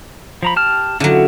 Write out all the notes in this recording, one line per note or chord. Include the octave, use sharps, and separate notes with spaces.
F3 A#5 B5
G4 A5 F6
D3 F#3 C#4 E4 F4